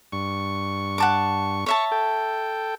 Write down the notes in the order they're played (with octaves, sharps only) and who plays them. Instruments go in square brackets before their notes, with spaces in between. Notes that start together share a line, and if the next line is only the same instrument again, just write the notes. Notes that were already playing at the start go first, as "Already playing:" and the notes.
[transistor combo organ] G2 C#6
[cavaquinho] F#5 A5 D6
[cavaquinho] C#5 E5 A5 [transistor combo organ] C#6
[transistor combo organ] A4 G5